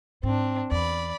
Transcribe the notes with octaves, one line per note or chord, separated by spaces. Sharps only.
G#2 C4 D4
E2 D5 B5